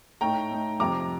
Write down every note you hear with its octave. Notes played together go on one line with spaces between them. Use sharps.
A2 A3 D#4 G5 A#5
A2 A3 D#4
F2 C3 F3 A#5 D6